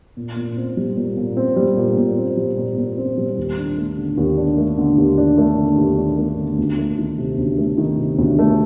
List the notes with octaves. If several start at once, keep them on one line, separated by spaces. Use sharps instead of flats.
A#2
A#2
C4
G3
A#2
A#2
C4
G3
A#2
A#2
C4
G3
A#2
A#2
C4
G3
D#2
D4
A3
D3
D#2
D4
A3
D3
D#2
D4
A3
D3
D#2
D4
A3
D3
D2
A3
D#3
C3
D2
A3
D#3
C3
D2
A3